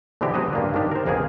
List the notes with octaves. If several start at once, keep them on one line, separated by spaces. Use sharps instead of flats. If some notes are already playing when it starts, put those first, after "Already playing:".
B2 D3 E3 C4 G4
F#3 G#3 F#4 B4 C5 D#5
G2 A#3 D4
D#3 C4 D4 G4
A#4 C5
A#1 F2 A#3 B3 G#4